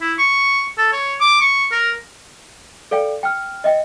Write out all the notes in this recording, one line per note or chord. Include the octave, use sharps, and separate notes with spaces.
E4
C#6
A4
C#5
D6
C#6
A#4
A4 D5 F5 G5
G5 F6
D#5 E5 G5